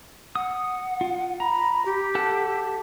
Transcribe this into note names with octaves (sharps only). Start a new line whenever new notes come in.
F#5 D#6
F4
A#5 B5
G4
A4 F#5 A5